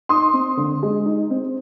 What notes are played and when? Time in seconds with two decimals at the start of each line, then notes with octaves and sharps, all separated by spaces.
0.09 D#4 C6 D#6
0.33 C4
0.57 D3
0.82 G#3
1.06 D#4
1.30 C4